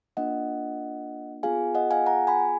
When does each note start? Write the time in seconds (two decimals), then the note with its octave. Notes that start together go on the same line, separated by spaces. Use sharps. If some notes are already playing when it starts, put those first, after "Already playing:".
0.17 A#3 D4 F4 D#5 F#5
1.43 B3 F4 G#4 F5 G#5
1.75 D#5 F#5
1.91 F5 G#5
2.06 F#5 A#5
2.27 G#5 B5